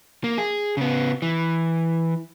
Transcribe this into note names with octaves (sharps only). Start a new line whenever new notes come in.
A#3
G#4
C#3 B3
E3